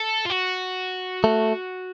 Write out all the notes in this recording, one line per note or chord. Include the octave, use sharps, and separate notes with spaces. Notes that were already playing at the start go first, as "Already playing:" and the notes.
Already playing: A4
F4
F#4
A3